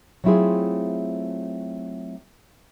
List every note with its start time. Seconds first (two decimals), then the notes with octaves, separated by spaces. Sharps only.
0.24 F#3 A3 C4 E4 F4 G#4